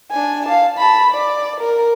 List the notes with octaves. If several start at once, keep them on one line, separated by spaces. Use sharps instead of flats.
D4 G#5
F5 A5
A5 B5
D5
A#4